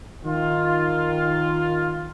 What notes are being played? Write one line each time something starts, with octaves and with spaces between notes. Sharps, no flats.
D#3 F4